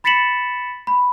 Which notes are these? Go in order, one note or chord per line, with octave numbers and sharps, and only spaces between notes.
B5 A6 B6 C#7 E7 F#7
B5